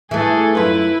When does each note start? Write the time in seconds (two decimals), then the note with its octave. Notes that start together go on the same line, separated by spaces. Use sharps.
0.11 E3 A3 G#4 A4
0.55 F#2 E4 F4 B4